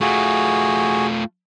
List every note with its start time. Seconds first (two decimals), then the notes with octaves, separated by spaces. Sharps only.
0.01 A3 F4 F#4 G#4